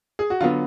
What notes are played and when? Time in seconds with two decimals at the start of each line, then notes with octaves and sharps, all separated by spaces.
0.19 G#4
0.30 F#4
0.41 D3 F#3 B3 F4